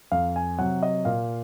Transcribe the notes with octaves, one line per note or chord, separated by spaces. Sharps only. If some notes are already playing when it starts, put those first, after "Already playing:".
F2 F5
G#5
C3 F#3 F#5
D#5
A#2 F5